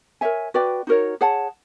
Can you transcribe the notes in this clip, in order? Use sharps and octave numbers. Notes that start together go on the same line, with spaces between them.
A#4 C#5 E5 G#5
F#4 B4 D5 G5
D#4 F#4 A#4 C#5
G#4 C#5 F#5 A5